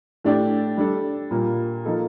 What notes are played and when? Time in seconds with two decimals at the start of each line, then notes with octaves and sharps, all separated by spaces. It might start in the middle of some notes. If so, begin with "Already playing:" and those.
0.24 A2 A3 D4 G4 D5
0.77 G3 D4 A4
1.31 A#2 G3 A#3
1.85 F3 A#3 D#4 A4